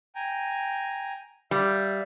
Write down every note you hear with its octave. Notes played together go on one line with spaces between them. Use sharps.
G5 G#5 A#5
G3 E5 F5